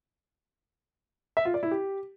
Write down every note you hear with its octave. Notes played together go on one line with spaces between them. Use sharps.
E5
F4
D5
E4
G4